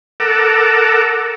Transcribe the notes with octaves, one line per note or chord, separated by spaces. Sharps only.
A4 A#4 F#5 D6 E6